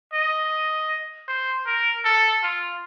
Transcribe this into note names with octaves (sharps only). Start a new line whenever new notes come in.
D#5
C5
A#4
A4
F4